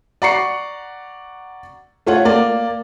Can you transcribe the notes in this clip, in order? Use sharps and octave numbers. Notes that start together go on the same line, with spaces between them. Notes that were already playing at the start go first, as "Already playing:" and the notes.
D5 F#5 A#5 C#6 C7 C#7
A3 F4 C#5 F#5
A#3 D5